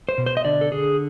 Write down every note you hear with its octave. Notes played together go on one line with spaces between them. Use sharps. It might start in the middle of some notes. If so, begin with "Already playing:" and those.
C5
B2
C5
D#5
D3 D5
A4
D3 G#4